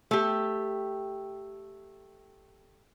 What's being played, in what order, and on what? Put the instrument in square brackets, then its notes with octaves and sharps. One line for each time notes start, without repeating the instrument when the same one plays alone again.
[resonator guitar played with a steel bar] A3 G4